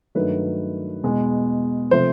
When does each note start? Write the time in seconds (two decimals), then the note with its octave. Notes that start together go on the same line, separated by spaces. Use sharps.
0.15 G2 D#3 F#3 A3 B4
1.03 E2 B2 G#3
1.91 C3 F3 A3 C5